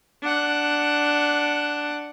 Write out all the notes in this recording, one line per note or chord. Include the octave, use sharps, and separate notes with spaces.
D4 F#5